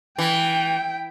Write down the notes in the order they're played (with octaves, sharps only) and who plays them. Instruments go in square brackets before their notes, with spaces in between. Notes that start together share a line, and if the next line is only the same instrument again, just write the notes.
[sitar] E3 [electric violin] G5